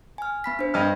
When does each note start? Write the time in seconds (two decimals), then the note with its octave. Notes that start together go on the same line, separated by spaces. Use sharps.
0.18 G#5 F6
0.44 B3 B5 B6
0.59 D4 C5
0.74 G2 D#5 F6